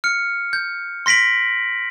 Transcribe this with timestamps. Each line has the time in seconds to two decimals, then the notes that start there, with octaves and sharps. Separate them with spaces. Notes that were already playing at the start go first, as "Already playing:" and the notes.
0.04 F6 C#7
0.53 G6
1.06 C6 A#6 B6 D7 F#7